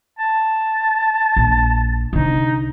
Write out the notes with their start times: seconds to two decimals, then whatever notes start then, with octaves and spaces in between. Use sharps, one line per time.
0.19 A5
1.36 A#1
2.13 C2 D3 D#4